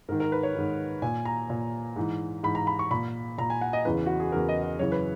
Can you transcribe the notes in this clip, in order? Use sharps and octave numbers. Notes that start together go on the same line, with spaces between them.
G#2 D#3 A#4
A#4
B4
C#5
G#2 D#3
A#2 G#5
A#5
A#2
G#2 E3
G#2 E3 B5
A#5
B5
C#6
A#2 B5
A#2 A#5
G#5
F#5
D#5
E2 C#3 E3 B4
F#4
G#4
E2 C#3 E3 A#4
D#5
D#5
F#2 C#3 E3 C#5
B4